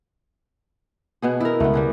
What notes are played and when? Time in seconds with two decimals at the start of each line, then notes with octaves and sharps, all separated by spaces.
1.22 B2 B3 G#4
1.40 E4 A#4
1.60 C#2 A3 B3
1.74 G3 B3 G#4